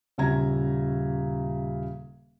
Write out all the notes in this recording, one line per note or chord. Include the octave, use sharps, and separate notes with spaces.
D#1 C#3 E5 A#5 G#6